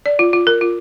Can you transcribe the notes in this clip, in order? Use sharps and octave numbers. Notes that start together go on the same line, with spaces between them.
D5
F4
F4
A#4
F4